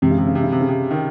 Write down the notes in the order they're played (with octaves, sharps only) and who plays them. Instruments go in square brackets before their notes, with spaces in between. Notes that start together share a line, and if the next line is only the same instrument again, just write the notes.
[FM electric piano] F#2 E3 G#3 C4 [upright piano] C3
[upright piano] C#3
C3
C#3
C3
C#3
C3
C#3
C3
D#3